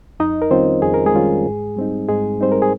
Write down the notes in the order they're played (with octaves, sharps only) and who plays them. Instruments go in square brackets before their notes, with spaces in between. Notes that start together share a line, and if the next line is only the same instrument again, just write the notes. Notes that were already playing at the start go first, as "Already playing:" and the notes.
[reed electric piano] F2 D#4 D#5
A#4
D#3 G3 C4 C#4 F4 C5
F2 G#4
A#4
G#3 G#4
D#3 G3 C#4 F4
G#2
G3 C4 D#4
G#2 G#3 G#4
G3 C4 D#4 C5
A#4
G#4